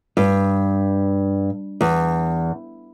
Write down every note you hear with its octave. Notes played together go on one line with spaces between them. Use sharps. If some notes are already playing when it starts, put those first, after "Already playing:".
G2
E2